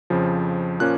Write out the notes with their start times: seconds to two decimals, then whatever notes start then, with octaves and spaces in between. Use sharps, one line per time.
0.10 F2 C#3 F3
0.80 A#2 F3 A#3 C#4 F#6